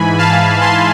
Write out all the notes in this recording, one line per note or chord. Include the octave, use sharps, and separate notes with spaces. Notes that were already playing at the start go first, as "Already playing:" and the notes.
Already playing: G#2 E3 G#5 B5
F5 A5
A5 C6